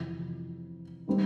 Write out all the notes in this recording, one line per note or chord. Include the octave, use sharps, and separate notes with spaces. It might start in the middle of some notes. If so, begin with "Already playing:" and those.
Already playing: F2 C3 E3
D#3 G3 C4